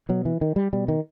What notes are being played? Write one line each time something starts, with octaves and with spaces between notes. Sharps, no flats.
B2 F#3
E3
D#3
G3
B2 G3
D#3